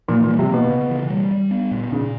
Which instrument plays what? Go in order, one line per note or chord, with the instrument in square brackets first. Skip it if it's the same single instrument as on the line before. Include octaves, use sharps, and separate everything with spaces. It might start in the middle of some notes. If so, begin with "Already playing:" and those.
[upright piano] A#2 [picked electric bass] E3
[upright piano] A#2
[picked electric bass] G3
[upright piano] C3
[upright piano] B2 [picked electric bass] A#3
[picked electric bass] C#3
E3
G3
G3
B3
A#2
[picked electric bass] A#2 [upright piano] C#3